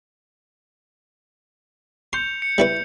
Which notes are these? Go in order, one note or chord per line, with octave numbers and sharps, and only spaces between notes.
C6 G6 C#7 F7
C#7
G3 E4 B4